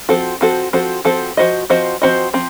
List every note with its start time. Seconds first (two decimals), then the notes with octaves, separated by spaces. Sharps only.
0.09 F3 C4 F#4 A4
0.41 F3 C4 F#4 A4
0.73 F3 C4 F#4 A4
1.05 F3 C4 F#4 A4
1.37 F3 C4 F#4 C5 D#5
1.70 F3 C4 F#4 C5 D#5
2.02 F3 C4 F#4 C5 D#5
2.34 F3 C4